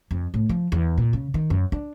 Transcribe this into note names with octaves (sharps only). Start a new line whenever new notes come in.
F2
A2
F3
E2
A#2
C#3
D#3
F#2
D4